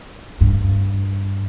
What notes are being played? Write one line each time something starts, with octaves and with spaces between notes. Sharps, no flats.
G2